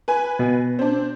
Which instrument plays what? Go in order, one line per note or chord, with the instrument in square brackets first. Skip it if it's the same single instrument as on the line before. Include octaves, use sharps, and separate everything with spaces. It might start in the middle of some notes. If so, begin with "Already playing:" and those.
[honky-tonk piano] B4 G#5
[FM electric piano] B2
[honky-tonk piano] C4 D4